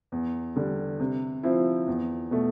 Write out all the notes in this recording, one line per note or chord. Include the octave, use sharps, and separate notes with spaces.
E2
D3 G3
C3
F3 C4 E4
E2
B2 A3